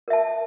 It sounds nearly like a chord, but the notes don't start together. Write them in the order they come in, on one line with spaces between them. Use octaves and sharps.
A#4 E5 A5